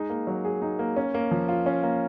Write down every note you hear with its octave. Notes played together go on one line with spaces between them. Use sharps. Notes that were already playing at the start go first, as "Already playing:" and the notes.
Already playing: G#3 D#4
A#3
F#3
G#4
D#4
A#3
C#4
A#3
F3
F4
C#4
A#3